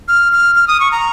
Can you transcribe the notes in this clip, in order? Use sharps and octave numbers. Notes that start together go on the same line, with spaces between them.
F6
F6
F6
D#6
C#6
A#5